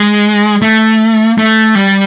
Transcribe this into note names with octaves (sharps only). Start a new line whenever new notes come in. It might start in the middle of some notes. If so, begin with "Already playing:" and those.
Already playing: G#3
A3
A3
G3